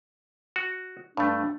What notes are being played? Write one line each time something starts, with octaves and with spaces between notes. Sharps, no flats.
F#4
G2 A3 D4
D4